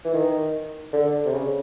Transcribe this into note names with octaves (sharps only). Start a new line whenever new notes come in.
E3
D#3
D3
C3
C#3